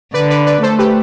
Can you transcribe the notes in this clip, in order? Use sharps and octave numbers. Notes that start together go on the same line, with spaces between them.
D3 B4 D5
B4 D5
B4 D5
A3 A4 C5
G4 B4